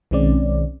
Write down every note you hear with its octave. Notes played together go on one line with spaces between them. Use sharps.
B1 D#3 G#3 C4 C#4 D5